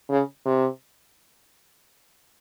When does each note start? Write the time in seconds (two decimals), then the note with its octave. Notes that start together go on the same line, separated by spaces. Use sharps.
0.10 C#3
0.46 C3